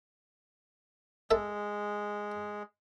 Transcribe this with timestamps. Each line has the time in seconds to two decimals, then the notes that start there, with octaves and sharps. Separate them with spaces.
1.31 G#3 A4 E5